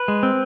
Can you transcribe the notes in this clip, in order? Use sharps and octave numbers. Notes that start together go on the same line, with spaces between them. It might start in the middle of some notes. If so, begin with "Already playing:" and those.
Already playing: B4
G#3
C4